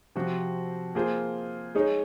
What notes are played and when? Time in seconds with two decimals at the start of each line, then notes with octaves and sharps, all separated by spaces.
0.15 C3 F3 C4 F#4 C5
0.95 A#3 F4 G#4 C5
1.75 G#3 D#4 G#4 C#5